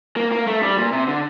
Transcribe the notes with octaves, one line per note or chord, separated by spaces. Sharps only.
A#3
A#3
A3
G3
A#2
C3
D3